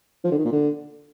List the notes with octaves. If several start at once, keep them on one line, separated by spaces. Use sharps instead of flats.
F3
D3
D#3
A#2
D3